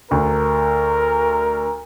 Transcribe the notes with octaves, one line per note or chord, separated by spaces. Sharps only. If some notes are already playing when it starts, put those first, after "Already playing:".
D2 A#4